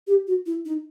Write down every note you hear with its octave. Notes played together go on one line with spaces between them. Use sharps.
G4
F#4
E4
D#4